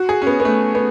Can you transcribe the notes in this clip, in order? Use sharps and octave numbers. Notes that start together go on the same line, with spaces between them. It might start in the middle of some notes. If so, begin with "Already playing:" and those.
Already playing: F#4
G#4
C#4
B3
B3
A3
B3